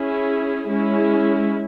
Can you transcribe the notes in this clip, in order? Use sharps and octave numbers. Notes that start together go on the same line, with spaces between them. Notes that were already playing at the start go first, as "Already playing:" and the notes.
Already playing: C#4 E4 G#4
G#3 C#4 E4